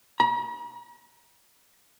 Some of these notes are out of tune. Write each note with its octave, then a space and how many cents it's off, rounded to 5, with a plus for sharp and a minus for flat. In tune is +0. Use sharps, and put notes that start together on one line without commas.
A#5 +45